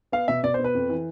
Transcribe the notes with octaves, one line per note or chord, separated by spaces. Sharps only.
B3 F5
B2 E5
B2 D5
C5
B3
B4
F2
E3